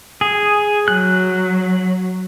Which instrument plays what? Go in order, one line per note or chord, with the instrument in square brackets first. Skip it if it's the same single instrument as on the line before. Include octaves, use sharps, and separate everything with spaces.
[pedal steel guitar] G#4
[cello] F#3 [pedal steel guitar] F#6